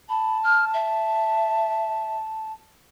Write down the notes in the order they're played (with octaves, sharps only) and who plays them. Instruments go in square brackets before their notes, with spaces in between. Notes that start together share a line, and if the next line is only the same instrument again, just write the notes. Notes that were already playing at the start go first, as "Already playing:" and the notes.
[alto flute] A5 [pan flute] B5
[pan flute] F6
E5